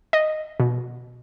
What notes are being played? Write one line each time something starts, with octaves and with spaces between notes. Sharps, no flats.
D#5
B2